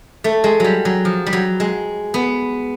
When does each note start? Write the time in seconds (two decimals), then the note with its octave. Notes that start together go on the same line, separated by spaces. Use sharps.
0.24 A3
0.44 G#3
0.60 F#3 G3
0.85 F#3
1.05 F3
1.26 G3
1.33 F#3
1.60 G#3
2.14 B3